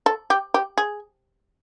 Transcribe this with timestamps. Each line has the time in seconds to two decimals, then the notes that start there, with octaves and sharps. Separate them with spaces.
0.06 A4
0.30 G4
0.54 G4
0.78 G#4